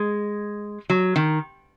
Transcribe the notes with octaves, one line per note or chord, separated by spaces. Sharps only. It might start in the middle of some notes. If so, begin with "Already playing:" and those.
Already playing: G#3
F#3
D#3